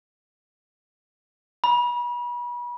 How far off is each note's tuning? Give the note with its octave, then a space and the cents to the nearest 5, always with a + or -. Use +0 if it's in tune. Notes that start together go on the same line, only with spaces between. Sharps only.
B5 -35